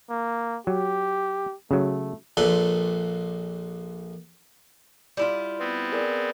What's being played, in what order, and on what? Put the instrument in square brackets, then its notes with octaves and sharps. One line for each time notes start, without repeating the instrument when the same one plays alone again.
[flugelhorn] A#3
[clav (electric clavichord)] F#3 [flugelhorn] G4
[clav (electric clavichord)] C#3 F#3 [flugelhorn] A3
[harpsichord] A#1 A#2 A4 B4 C6
[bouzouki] G3 E4 F4
[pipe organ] B3 C4
[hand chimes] G#4 A#4 D5